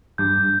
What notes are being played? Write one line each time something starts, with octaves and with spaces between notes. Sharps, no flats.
G2 G6